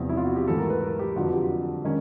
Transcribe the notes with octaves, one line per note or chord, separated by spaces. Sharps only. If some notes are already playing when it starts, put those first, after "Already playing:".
Already playing: E2 C3 F3
E4
F4
F#4
G4
G#2 E3 A3 A4
A#4
B4
A#4
G4
F2 D3 F#3 F4
G4
D#3 G#3 C#4